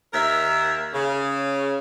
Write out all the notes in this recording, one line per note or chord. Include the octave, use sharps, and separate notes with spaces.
D#2 A#4 E5
C#3